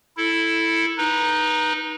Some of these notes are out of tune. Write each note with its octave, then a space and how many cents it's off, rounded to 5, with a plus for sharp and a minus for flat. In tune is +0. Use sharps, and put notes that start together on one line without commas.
E4 +0 A4 +0
D#4 +0 B4 -30